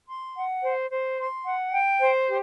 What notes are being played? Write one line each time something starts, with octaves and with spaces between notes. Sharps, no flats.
C6
F#5
C5
C5
C6
F#5
G5
C5
G4